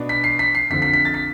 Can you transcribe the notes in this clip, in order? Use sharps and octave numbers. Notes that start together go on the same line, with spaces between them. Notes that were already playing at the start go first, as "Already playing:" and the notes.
Already playing: B2 B3 D4
B6
C7
B6
C7
F2 D3 F3 B6
B6
B6
A6
B6